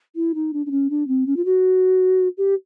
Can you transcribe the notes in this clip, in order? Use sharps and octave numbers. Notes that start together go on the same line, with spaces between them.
E4
D#4
D4
D4
C#4
D4
C4
C#4
F4
F#4
G4